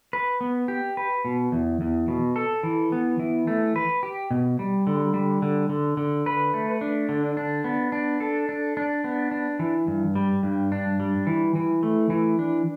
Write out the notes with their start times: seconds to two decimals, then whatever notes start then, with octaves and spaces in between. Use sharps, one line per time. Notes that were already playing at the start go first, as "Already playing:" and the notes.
0.13 B4
0.41 B3
0.68 G4
0.97 B4
1.25 B2
1.52 E2
1.81 E2
2.08 B2
2.36 A4
2.63 E3
2.92 B3
3.19 E3
3.47 A3
3.76 B4
4.03 G4
4.31 B2
4.59 G3
4.87 D3
5.14 G3
5.42 D3
5.69 D3
5.97 D3
6.26 B4
6.54 A3
6.81 D4
7.09 D3
7.37 D4
7.64 B3
7.92 D4
8.20 A4
8.49 D4
8.77 D4
9.04 B3
9.31 D4
9.59 E3
9.87 G2
10.15 G3
10.43 G2
10.72 D4
11.00 G3
11.27 E3
11.55 E3
11.83 A3
12.10 E3
12.39 D4